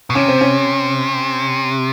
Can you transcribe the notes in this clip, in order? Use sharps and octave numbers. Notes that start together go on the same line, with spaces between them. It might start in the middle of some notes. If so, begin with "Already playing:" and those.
B2
C3 C#4
C4
C#4